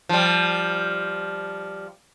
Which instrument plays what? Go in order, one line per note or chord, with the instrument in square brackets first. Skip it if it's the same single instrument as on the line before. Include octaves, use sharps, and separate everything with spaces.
[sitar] F3 G3